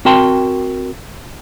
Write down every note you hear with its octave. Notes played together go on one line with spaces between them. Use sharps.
C4 F#4 A#4 G5 A5 C6